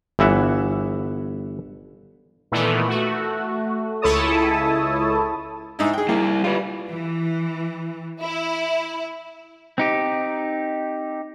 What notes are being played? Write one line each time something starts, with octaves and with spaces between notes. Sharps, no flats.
G1 E3 E5 F#5
A#2 D#3 E3 A3 B3
A3 F#4
C#2 E4 A4 C#5 A5 D#6
G#2 D#4 E4
G#4 G5
G3 A#3 E4
G3 F4 B4
E3
E4
C4 D#4 G4